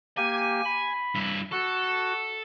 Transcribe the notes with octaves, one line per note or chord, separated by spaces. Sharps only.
A#3 G4 G#5
B5
G2 E4
F#4 A4